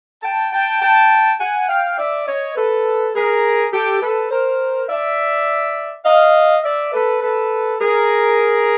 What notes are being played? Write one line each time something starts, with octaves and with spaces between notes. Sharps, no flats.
G5 A5
G5 A5
G5 A5
F#5 G#5
F5 G5
D5 E5
C#5 D#5
A4 B4
G#4 A#4
G4 A4
A4 B4
A#4 C5
D5 E5
D#5 F5
D5 E5
A4 B4
A4 B4
G#4 A#4